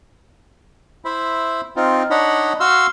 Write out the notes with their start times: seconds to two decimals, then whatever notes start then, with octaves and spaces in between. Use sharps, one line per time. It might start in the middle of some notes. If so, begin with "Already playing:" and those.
1.05 E4 C5 E5 B5
1.76 C4 D#4 F4
2.10 D4 D#4 C#5 D#5 F#5 B5
2.60 F#4 F5 C6 E6